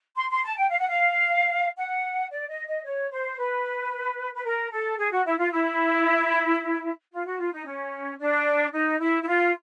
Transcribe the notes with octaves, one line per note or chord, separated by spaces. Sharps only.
C6
C6
A5
G5
F5
F#5
F5
F#5
D5
D#5
D#5
C#5
C5
B4
B4
A#4
A4
G#4
F#4
E4
F4
E4
F4
F#4
F4
D#4
C#4
D4
D#4
E4
E4
F4